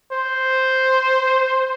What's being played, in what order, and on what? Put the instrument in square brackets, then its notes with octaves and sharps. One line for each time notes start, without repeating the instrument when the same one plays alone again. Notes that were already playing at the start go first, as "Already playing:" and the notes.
[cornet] C5